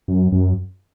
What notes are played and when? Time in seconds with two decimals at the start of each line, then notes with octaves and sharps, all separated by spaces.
0.08 F#2
0.32 F#2